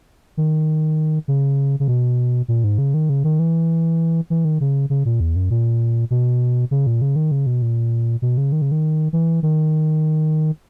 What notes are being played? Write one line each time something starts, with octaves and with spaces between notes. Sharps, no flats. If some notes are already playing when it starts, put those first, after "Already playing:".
D#3
C#3
C#3
B2
A#2
G#2
C#3
D#3
C#3
D#3
E3
E3
D#3
C#3
C#3
A#2
E2
F#2
A#2
B2
C#3
A#2
C#3
D#3
C#3
B2
A#2
B2
C#3
D#3
C#3
D#3
E3
D#3